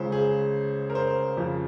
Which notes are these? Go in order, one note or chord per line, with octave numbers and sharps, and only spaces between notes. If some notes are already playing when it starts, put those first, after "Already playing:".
Already playing: C#2 C#3 G#3 C5
G#4
A#4
C5
F2 C#3 F3